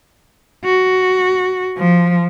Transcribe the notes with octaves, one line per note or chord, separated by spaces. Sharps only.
F#4
F3